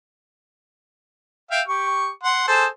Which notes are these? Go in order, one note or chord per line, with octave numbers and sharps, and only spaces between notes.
E5 F5 G5
G4 C#6
F#5 C6
G#4 A4 C5